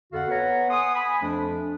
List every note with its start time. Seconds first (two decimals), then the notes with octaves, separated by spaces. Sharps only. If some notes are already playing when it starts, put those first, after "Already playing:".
0.13 F2 D3 F#4 A4 F5 F#5
0.28 B3 A4 B4 C#5 F#5 A#5
0.70 F#5 G#5 C6 D#6
0.95 G#5 B5
1.22 F2 F3 A3 D4